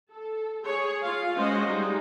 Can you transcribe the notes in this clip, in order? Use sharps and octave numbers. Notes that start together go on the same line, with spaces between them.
A4
G#4 C#5
F4 F5
G#3 C#4 F#4 C5 D#5
G3 G#3 D#4